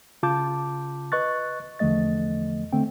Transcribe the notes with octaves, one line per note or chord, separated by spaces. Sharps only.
C#3 F4 A5 D6 G6
B4 D#5 C#6 F#6 A6
E2 D3 F3 A3 D#5 A6
D3 A3 C4 G5